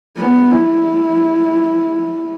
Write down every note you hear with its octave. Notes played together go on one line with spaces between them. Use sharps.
B3
E4